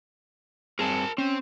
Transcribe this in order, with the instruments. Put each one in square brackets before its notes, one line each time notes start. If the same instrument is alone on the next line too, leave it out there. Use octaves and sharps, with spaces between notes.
[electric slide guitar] G2 C4 G#4 [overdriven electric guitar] A#4 A5
[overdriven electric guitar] C4 [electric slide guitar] C#4